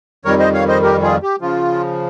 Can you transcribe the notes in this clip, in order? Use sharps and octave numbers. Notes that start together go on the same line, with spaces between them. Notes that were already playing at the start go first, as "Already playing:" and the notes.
F2 D#3 G3 A#4 C#5
C5 D#5
C#5 F5
C5 D#5
G4 A#4
F4 G#4
G4
C#3 F3 F4